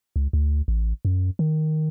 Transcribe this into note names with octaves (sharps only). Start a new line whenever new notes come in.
C#2
D2
A1
F#2
D#3